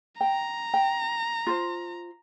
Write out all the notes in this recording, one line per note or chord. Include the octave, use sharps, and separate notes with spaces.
G5 A#5
G5
F4 C5